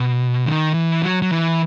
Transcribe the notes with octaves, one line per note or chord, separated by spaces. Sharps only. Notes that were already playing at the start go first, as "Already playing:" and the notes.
Already playing: B2
D#3
E3
F#3
F#3
E3